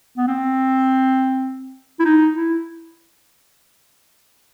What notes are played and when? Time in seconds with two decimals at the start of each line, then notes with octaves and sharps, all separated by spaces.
0.17 B3
0.28 C4
2.00 E4
2.05 D#4
2.34 E4